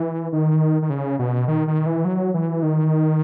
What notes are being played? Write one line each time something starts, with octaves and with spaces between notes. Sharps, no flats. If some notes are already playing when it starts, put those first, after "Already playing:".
Already playing: E3
D#3
D#3
C#3
B2
D#3
D#3
E3
F#3
E3
D#3